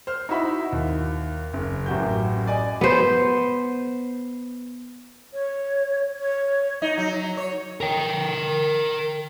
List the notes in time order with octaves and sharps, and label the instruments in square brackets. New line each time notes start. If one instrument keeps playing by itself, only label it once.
[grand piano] C5 F6
D#4 E4 F#4 E5 B5
D#2
F#1
A1 F#2 F#4 G4 G6
D5 D#5 G#5
[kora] B3 C5
[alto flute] C#5
C#5
[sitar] D#4
F#3
C#5
[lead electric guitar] A#4 G5